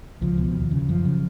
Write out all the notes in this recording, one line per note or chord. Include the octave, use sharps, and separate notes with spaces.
C#2 F3
B2
D#2
C#3
F#2 F3
C#3